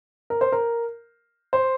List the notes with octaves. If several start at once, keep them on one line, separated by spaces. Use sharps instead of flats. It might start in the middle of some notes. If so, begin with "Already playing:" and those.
A#4
C5
A#4
C5